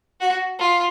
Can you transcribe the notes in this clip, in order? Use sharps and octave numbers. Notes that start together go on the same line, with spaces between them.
F#4
F4